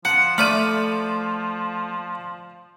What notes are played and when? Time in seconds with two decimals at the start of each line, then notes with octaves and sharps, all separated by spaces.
0.05 F3 F#5 C#7
0.38 A3 D5 B5 F6 D#7